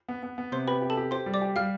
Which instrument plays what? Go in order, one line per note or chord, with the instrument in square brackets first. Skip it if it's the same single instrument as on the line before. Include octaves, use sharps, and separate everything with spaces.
[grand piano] B3
B3
B3
[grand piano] C3 [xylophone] C5 C6
[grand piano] G4 [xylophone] B4 B5
[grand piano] G4
[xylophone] A4 A5
[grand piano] G4
[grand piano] G4 [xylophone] C5 C6
[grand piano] G3
[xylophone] D5 D6
[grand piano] G4
[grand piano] G3 [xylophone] F5 F6